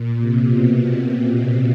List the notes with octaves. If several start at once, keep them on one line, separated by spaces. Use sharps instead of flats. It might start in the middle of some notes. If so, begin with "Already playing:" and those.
Already playing: A#2
C3
B2